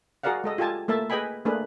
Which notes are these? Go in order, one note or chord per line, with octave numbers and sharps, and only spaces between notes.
F#4 G#4 A#4 D5 F5 F#5
G#3 A4 D#5
F4 G4 A4 G#5 A5
A3 A#3 E5 A5
G#4 B4 D#5 G5 G#5 B5
A3 A#3 D4 G#4 B4